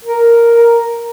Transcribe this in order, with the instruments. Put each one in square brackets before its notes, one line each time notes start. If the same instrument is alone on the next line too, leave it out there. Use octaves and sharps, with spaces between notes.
[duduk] A#4